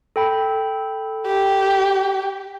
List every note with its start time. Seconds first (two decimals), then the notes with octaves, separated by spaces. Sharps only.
0.16 A4 G5 B5
1.27 G4